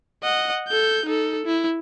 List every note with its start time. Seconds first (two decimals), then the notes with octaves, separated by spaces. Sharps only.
0.23 D#5 F#5
0.68 A4 G6
1.06 D#4 A4
1.45 E4